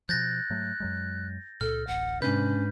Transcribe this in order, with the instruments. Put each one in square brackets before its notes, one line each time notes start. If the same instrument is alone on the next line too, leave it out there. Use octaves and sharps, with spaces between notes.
[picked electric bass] B2 F3 [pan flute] F#6 [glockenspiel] G6 A6 A#6
[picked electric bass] G#2 F#3 A3
F#2 F#3 G#3
[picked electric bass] C#2 A#2 [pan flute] A4 [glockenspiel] F6
[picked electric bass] D1 A1 [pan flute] F#5
[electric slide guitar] G#2 D4 B4 [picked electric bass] C3 [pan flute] C#4 [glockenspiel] G6